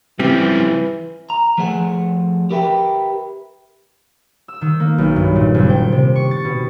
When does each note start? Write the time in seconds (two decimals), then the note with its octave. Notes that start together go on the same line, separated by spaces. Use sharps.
0.19 C#3 E3 F3 G3 C4 G4
1.30 A#5
1.58 F3 A3 G#4 C5 F#5 G#5
2.51 G4 A#4 B4 E5 G5
4.48 E6
4.61 D#3
4.80 A#3
4.98 B1
5.16 G2
5.36 A#2
5.54 F#1
5.69 G5
5.92 C3
6.16 C#6
6.31 A6
6.45 B2